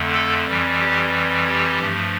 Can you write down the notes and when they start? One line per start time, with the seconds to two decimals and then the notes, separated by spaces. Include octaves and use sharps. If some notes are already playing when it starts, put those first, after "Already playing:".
Already playing: F2 D3 A3
0.14 A4
0.46 F2 E3 G3
0.79 G4
1.47 G4
1.79 G2 F3 A3